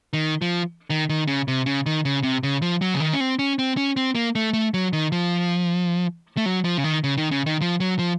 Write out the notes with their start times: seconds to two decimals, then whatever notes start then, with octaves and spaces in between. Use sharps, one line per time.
0.13 D#3
0.42 F3
0.90 D#3
1.09 D#3
1.27 C#3
1.48 C3
1.66 C#3
1.86 D#3
2.05 C#3
2.23 C3
2.43 C#3
2.62 F3
2.82 F#3
2.94 C#3
3.00 D#3
3.13 C#4
3.20 C4
3.39 C#4
3.59 C4
3.77 C#4
3.97 C4
4.15 A#3
4.35 A3
4.53 A3
4.74 F#3
4.93 D#3
5.12 F3
6.37 A3
6.46 F#3
6.64 F3
6.78 C#3
6.84 D#3
7.04 C#3
7.17 D#3
7.31 C#3
7.46 D#3
7.61 F3
7.80 F#3
7.99 F3